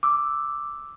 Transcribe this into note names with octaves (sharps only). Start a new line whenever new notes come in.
D6 E6